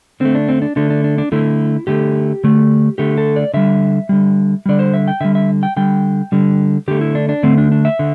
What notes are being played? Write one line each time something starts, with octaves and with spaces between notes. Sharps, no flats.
D3 A3 C4
D4
C4
D4
D3 A3 D4
D4
D4
D4
D3 A3 E4
D3 A3 G4
D3 A3
D3 A3 G4
A4
D5
D3 G3 E5
D3 G3
D3 G3 D5
C5
E5
G5
D3 G3 E5
E5
G5
D3 G3 G5
D3 G3
D3 A3 G4
E4
D4
D4
D3 A3 C4
D4
D4
E5
D3